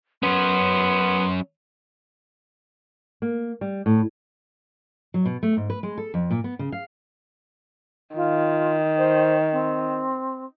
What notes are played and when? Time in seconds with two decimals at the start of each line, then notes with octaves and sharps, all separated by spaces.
0.23 F#3 B3 C#4 C6
3.22 A#3
3.61 G3
3.86 A2
5.14 F#3
5.26 B2
5.43 A3
5.57 G#2
5.70 B4
5.83 G#3
5.98 A4
6.14 F2
6.31 A#2
6.44 B3
6.59 C#3
6.72 F5
8.16 D#3 F4
8.98 C5
9.52 C4